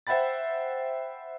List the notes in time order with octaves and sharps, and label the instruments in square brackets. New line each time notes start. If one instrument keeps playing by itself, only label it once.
[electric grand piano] C5 E5 F#5 G5 B5 A6